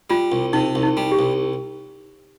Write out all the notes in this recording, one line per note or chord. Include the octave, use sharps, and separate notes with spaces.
G3 F4
C2
C3 D#4
C2
D#4
G3
G4
C2